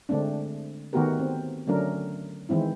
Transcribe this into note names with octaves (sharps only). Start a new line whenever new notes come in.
D3 G#3 A3 C4 D4
D#3 A3 B3 F#4 G4 A#4
C4
D3 F#3 A3 C#4 D4 A#4
D#3 E3 G#3 C4 E4